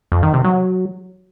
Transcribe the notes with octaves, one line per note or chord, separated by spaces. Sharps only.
F2
D#3
C3
F#3